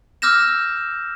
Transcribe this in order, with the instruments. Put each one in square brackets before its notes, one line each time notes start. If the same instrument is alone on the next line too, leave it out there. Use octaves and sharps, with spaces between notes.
[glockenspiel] D6 E6 F6 G6 A#6 E7